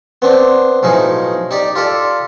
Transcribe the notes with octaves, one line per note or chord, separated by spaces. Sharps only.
B3 C4 D4
B1 A2 F3 D#4 G#4
D#4 G4 D5
F4 G4 A4 D5